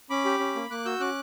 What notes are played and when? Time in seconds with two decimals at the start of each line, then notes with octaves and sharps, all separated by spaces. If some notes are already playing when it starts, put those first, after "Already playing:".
0.10 C#4 B5 D6
0.25 G4
0.40 C#4
0.55 A#3
0.70 A#3 D6 F#6
0.85 F#4 E6 G6
1.00 C#4 D6 F#6